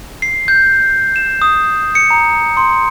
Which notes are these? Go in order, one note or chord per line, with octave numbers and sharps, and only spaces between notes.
C7
G6
E7
D#6
C#7
A#5
C6